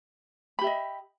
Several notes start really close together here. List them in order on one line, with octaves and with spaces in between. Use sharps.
B5 G4 E5 D#5